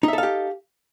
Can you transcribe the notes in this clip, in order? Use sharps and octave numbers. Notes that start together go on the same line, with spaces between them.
D#4 G4 A4 E5 F5